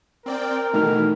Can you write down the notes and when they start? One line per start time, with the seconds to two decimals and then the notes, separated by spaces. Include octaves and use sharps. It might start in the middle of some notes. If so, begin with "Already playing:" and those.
0.26 C4 A#4 D5 G5
0.74 B2 D#3 E3 A3 F6